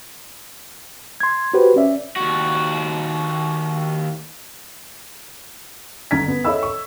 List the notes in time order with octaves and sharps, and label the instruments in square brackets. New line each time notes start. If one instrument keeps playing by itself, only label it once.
[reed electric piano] C6 G#6
F#4 G4 B4 C5
C#4 D5 E5
[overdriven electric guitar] D#2 F#4
[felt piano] G1 D3 A#5 G#6 B6
B3
A4 C#5 D#5 E5 B5 E6
C#6